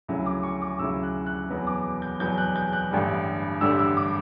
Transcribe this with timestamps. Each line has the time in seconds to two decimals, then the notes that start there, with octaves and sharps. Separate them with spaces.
0.08 D2 C#3 F#3 C#4 E4
0.26 D6
0.43 C#6
0.62 D6
0.79 D2 C#3 F#3 C#4 E4 E6
1.03 F#6
1.26 F#6
1.50 E2 B2 F#3 B3
1.67 D6
2.02 G6
2.20 E2 B2 F#3 B3 G6
2.38 F#6
2.56 G6
2.73 F#6
2.90 A1 G2 D3 G3
3.61 A1 G2 D3 G3 E6
3.79 E6
3.97 D6